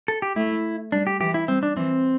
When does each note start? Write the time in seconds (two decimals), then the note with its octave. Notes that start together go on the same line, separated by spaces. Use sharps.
0.08 A4
0.22 G4
0.36 A3 E4
0.92 G3 D4
1.07 G4
1.21 E3 G4
1.34 E4
1.48 G3 C4
1.63 D4
1.76 E3 C4